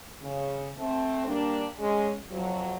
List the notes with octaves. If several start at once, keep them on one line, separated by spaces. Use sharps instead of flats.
C#3
A3 C4
G3 A#3 D4
G#3 C#4
F2 F#3